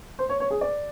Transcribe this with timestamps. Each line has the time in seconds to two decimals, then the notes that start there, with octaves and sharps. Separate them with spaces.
0.19 C5
0.29 C#5
0.40 C#5
0.51 G#4
0.61 D5